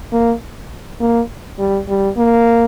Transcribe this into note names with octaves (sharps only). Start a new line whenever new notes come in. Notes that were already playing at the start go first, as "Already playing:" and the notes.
A#3
A#3
G3
G3
A#3